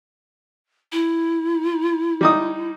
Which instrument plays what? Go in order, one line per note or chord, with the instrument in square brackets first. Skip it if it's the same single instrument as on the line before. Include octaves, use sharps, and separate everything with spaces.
[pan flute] E4
[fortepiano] G3 D#4 D#6